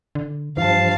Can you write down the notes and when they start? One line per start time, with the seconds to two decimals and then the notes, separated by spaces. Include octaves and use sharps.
0.15 D3
0.57 G2 E3 F3 F5 A5